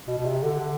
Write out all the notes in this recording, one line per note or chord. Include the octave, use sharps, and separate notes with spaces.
B2
B2
C3
D3
D3